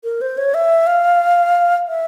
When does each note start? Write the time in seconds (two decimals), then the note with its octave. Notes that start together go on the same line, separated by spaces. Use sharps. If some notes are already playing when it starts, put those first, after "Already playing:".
0.04 A#4
0.21 C5
0.37 C#5
0.54 E5
0.87 F5
1.88 E5